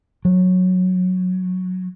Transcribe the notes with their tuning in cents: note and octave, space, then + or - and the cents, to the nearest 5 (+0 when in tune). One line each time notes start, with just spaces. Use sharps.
F#3 -10